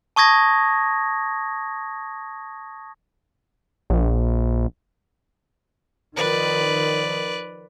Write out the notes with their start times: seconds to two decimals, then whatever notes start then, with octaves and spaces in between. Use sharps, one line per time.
0.16 A5 C#6 D#6 G#6 A#6
3.90 A#1
6.17 D#3 F3 B4 D5